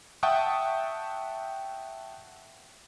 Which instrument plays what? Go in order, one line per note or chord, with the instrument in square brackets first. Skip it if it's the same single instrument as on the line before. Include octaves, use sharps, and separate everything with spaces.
[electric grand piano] E5 F#5 G5 A5 C#6 D#6